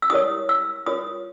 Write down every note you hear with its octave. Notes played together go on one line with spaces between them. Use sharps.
E6
E4 G4 A#4 C#5 D#6
E6
F4 A#4 C#5 D#6